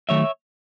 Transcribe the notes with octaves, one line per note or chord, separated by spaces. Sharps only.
D#3 F#3 A3 C#5 E5